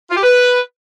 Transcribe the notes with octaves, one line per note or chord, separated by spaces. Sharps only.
F4
G4
B4